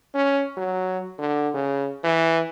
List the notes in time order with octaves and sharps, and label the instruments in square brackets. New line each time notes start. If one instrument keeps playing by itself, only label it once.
[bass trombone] C#4
F#3
D3
C#3
E3